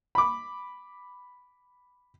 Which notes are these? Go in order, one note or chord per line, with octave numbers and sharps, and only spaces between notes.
B5 D6